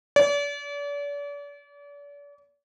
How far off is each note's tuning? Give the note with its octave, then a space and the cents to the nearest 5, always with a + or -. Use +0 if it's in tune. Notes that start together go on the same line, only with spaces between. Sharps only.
D5 -40